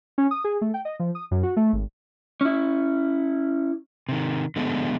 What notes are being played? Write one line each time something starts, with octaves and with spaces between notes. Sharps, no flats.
C#4
D#6
G#4
A3
G5
D#5
F3
D#6
F#2
F#4
A3
G#1
C#4 E4
C3 D#3
D3 F3 G#3 A3 B3